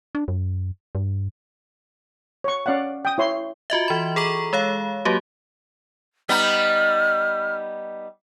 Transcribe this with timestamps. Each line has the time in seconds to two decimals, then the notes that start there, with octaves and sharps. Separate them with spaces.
0.15 D4
0.28 F#2
0.95 G2
2.44 C#5 C#6
2.66 C#4 D5 F5 F#5
3.05 G5 D#6
3.18 E4 C#5 C6
3.70 F4 F#4 D#5 E5
3.88 E3 B5
4.16 G#4 A4 A#5 C#6
4.53 G#3 C#5 F5
5.05 F#3 A#3 F#4 G4
6.29 G3 B3 D#4 F6